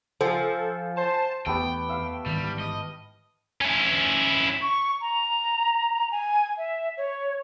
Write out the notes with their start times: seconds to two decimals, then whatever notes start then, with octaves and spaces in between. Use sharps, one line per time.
0.21 F3 A4 F5 F#5 G#5
0.97 C5 A5
1.47 E2 A3 B3 G4 G5
1.89 E5 F5 B5
2.26 G#2 D#3 E3 G3
2.60 D#5
3.61 C#4 E4
4.62 C#6
5.01 A#5
6.12 G#5
6.58 E5
6.97 C#5